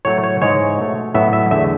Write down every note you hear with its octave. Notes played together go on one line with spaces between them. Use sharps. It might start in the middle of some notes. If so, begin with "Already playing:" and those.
A2 F#3 A3 C#5
C#5
G#2 E3 G#3 C#5
B2 A3
A2 F#3 B3 E5
E5
E2 D3 A3 E5